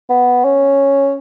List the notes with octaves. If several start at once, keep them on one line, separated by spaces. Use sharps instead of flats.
B3
C#4